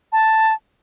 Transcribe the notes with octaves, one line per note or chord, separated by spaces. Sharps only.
A5